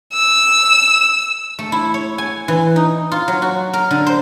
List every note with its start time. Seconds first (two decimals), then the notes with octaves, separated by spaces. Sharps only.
0.13 E6
1.59 A3
1.72 E4
1.94 C#5
2.18 G#5
2.48 E3
2.76 D#4
3.12 F4
3.28 F#3
3.42 F#4
3.73 A#4
3.91 D3
4.06 C5